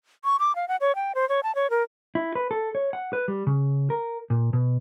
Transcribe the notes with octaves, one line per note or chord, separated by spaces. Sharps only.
C#6
D6
F5
F#5
C#5
G5
C5
C#5
A5
C#5
A#4
E4
B4
A4
C#5
F#5
B4
G3
C#3
A#4
A#2
B2